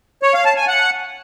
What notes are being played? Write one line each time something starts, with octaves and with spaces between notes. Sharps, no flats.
C#5
F5
A5
G#5
F#5